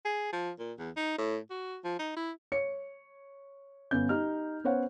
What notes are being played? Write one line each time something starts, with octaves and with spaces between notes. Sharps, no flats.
G#4
F3
A#2
E2
D#4
A2
F#4
F3
D#4
E4
C#5 C#7
G1 B3 C#4 G6
D#4 G4 F6
B3 C#4 C5 C#5 F#5